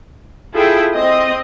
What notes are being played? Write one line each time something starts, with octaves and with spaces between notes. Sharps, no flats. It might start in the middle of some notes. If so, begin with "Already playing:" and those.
E4 F4 G#4 A4 G5
C4 D#5